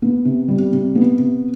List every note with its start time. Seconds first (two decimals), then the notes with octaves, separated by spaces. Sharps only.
0.02 B3
0.25 C3
0.48 G3
0.72 C3
0.95 B3
1.19 C3